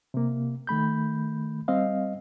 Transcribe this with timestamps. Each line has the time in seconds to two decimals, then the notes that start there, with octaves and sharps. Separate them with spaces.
0.14 C3 A#3
0.67 D#3 A3 B5 G6
1.68 G3 C4 D#5 F5